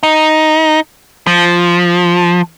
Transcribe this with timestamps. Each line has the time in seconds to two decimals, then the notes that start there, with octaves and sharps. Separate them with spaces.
0.03 D#4
1.27 F3